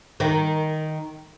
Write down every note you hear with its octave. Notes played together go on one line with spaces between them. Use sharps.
D#3